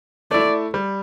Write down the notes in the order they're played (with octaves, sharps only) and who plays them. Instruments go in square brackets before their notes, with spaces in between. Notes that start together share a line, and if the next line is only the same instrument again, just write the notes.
[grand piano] A3 E4 [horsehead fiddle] D5
[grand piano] G3